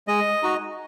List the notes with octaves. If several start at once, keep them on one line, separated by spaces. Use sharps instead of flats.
G#3 D#5
D#4 F#4